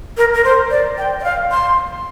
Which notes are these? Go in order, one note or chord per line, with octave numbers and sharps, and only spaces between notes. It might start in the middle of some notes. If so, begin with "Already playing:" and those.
A#4
A#4
C5
D5
G5
D5
F5
C6